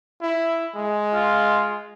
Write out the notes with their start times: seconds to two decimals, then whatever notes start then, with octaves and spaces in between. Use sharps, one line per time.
0.22 E4
0.76 G#3
1.14 F4